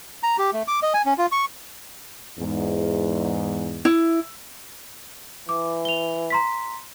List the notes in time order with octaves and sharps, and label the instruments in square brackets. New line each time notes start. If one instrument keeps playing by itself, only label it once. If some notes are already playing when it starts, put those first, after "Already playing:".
[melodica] A#5
G4
A3
D6
D#5
G#5
C#4
F4
C#6
[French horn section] E2 G#2
[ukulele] E4
[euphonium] E3 [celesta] D6
[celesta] F7 G7
A#5 C6 B6